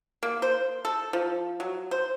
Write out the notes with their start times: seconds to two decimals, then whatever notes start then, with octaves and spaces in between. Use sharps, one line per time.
0.23 A#3
0.42 C5
0.85 A4
1.13 F3
1.60 F#3
1.91 C5